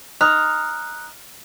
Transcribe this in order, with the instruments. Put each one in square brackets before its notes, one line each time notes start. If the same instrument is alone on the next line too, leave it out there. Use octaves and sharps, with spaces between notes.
[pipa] D#4 [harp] F6 [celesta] F#6